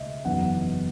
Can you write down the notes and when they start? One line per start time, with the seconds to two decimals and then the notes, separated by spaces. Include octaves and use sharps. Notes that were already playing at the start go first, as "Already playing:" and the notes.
Already playing: C#2 B2 A3 D#5 E5
0.25 F#1 E2 D#3 F#3 B3 F#5